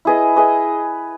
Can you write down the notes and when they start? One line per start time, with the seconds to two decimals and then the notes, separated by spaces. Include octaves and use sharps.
0.05 E4 G#4 B4 D#5
0.36 E4 G#4 B4 D#5